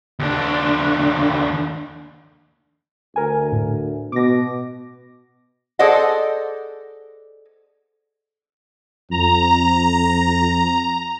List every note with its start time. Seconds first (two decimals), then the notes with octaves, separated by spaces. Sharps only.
0.19 D#2 D4
3.16 D2 A#4 G#5
3.52 A2
4.12 B2 D6 A#6
5.79 G#4 A4 C5 D5 D#5 F#5
9.11 F2 A#5